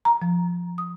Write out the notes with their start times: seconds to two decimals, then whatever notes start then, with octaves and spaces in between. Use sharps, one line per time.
0.05 A#5
0.22 F3
0.78 D#6